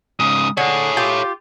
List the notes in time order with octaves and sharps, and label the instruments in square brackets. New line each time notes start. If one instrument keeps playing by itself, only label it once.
[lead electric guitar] G#2 C#3 [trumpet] D#6
[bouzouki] D3 [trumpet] G#4 [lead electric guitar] A4 C#5
[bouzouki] F4 G4